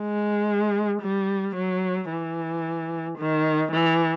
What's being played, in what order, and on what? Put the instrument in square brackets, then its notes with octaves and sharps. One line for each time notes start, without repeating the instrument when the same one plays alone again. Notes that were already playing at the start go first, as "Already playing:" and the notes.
Already playing: [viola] G#3
G3
F#3
E3
D#3
E3